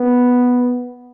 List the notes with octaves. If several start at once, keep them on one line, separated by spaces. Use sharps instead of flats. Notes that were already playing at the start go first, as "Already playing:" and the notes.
Already playing: B3